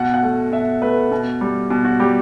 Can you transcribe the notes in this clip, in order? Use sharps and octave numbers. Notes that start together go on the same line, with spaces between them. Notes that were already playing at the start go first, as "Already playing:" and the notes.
Already playing: B2 F#5
F#5
A3
B2 E5
A3 B4
B2
G3
B2
F#4
G3 G4